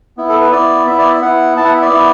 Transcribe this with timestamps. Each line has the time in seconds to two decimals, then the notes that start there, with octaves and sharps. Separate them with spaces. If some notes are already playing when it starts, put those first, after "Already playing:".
0.17 B3 E4
0.29 A4
0.41 B4
0.52 B3 E4 D5
0.87 B3 E4 E5
0.98 D5
1.10 E5
1.22 B3 E4 F#5
1.57 B3 E4 A5
1.65 F#5
1.74 E5
1.82 D5
1.91 B3 E4